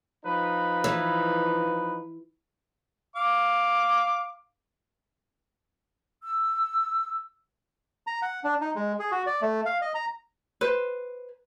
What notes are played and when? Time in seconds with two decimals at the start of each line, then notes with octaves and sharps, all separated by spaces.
0.25 F3 D#4 B4
0.84 E3
3.16 F5 D6
6.23 E6
8.07 A#5
8.22 F#5
8.44 D4
8.61 D#4
8.75 G#3
8.99 G#4
9.12 F#4
9.26 D5
9.42 A3
9.66 F5
9.82 D#5
9.94 A#5
10.61 B4 C5